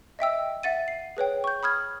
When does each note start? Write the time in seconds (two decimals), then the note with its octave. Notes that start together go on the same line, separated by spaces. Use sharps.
0.19 D#5 E5 G5 E6
0.63 E5 F#5 A6 D#7
0.88 C7
1.17 G#4 B4 C#5 G5
1.44 C#6 G6
1.63 B5 D#6 F6 G#6